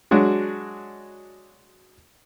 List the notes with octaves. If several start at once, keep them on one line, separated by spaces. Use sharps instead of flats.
F#3 G#3 D4 F#4